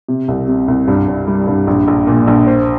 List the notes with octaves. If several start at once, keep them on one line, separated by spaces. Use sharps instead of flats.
C3
C2
C3
C2
G2
G2
G3
G2
A#1
A#1
A#2
A#1
C5